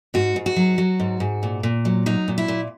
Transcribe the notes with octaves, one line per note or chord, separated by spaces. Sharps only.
G#2 F#4
G#2
F#4
F#3
F#3
G#2
G#2
A#2
A#2
F#3
F#3 D#4
A#2
E4
A#2